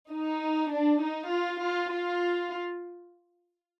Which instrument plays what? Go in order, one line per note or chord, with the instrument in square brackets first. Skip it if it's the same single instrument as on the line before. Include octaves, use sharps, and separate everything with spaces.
[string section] D#4
D4
D#4
F4
F4
F4